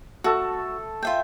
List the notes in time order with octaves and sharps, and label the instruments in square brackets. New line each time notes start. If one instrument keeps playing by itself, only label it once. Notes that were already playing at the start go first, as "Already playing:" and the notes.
[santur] A3 A4 [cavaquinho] F#4
[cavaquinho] F4 E5 G5